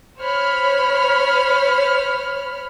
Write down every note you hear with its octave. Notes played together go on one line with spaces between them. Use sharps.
C5 C#5 B5 F6